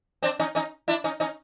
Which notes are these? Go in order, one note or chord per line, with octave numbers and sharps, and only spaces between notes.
C4 D4
C#4 D#4
C#4 D#4
D4 E4
C#4 D#4
C#4 D#4